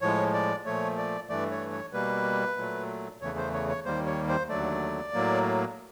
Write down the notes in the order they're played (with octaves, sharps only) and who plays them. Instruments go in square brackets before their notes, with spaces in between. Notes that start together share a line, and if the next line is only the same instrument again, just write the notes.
[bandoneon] A2 F3 G#3 C#5
D5
A#2 F3 A3 C#5
D5
G2 E3 A3 D5
C#5
C#5
B2 G3 A#3 B4
A#2 F#3 A3
E2 C#3 E3 A3 C#5
C5
C#5
C#5
D#2 D#3 G3 A#3 C5
C#5
C5
D#2 D3 F#3 A3 D5
A2 F#3 A#3